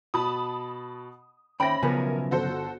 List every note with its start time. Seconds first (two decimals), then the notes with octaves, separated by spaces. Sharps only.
0.14 B2 A5 B5 D#6
1.60 D#2 C#4 C5 E5 G5 B5 A#6
1.83 B1 C#3 F3 B3 A#4 G#5
2.31 G1 F#4 A4 C5